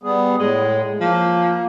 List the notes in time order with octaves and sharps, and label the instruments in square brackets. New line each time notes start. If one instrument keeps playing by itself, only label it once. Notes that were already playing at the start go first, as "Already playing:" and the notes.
[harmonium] G3 B3 G#4
[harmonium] A2 [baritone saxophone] G#3
[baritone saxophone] F3 [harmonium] A#3